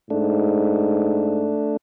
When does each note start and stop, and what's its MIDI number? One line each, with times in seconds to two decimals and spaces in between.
0.10 1.56 44
0.10 1.77 57
0.10 1.77 62